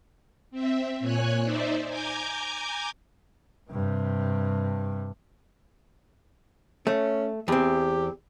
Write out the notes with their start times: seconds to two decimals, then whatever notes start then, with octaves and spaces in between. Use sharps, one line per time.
0.51 C4 E5
1.00 A#2 C#5 G#5 F#6
1.43 D#4 C5 D5 E5
1.88 G#5 A#5 D6 G6 G#6
3.71 G2 C3
6.87 A3 C#4
7.48 E2 C4 G4